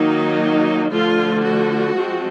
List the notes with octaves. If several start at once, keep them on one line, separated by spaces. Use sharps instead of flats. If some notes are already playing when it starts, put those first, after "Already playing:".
Already playing: D#3 F#3 A#3 D#4
D3 F3 A3 F4
F#4
F3 G#3 C4